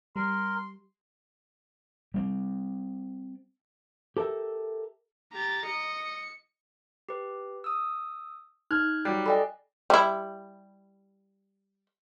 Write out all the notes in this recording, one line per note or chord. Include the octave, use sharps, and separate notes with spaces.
G3 A#4 C6
G3 A#3 C4
G4 A4 A#4 E5
G4 A#5 A6
D#5 C#7
G4 B4
D#6 E6
D#4 F6 F#6 G#6
F#3 G3 G5 F#6 C7
A4 D5 D#5 G5 G#5 B5
G3 E4